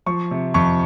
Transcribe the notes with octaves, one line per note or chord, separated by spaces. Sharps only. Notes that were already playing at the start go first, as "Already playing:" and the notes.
F3 C#6
C3
F2 C#6